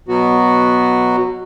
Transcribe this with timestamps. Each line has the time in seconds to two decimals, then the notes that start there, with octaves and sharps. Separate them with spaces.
0.08 B2 F#3 B3 F#4